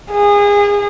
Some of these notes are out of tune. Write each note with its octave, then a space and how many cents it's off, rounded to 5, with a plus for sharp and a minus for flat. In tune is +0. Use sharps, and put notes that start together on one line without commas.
G#4 -30